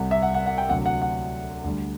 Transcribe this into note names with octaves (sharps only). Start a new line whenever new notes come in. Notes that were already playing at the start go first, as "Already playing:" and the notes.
Already playing: C2 C3 G3 F#5
E5
F#5
F#5
F#5
G5
D2 C3 F#3 F#5
F#5
F#5
D2 D3 G3